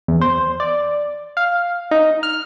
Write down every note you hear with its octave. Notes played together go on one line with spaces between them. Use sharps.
E2
C5
D5
F5
D#4
F6